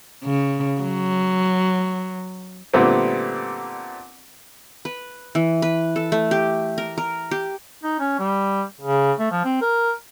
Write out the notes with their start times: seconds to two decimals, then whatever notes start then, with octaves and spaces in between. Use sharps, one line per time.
0.24 C#3
0.81 F#3
2.74 A#2 D3 G3 A3 B3 C4
4.85 B4
5.35 E3
5.62 B4
5.96 A4
6.12 A3
6.31 G4
6.78 A#4
6.98 A#4
7.31 G4
7.84 D#4
8.00 C#4
8.20 G3
8.81 C#3
9.19 A3
9.31 F3
9.45 C4
9.62 A#4